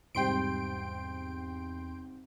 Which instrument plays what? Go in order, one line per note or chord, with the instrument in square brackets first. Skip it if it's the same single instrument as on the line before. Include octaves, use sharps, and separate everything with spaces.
[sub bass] E2 [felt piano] G#2 C3 G3 [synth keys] G5 C6 D7